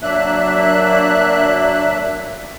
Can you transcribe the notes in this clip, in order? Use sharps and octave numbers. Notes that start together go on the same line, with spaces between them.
F#3 A#3 D4 E5 F#6